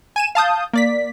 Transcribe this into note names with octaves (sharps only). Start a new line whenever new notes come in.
G#5 D#7 E7
F5 A5 D#6 G6
A#3 D5 B6